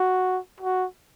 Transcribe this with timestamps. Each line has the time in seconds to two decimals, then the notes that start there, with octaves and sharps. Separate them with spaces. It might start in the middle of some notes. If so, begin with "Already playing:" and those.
Already playing: F#4
0.60 F#4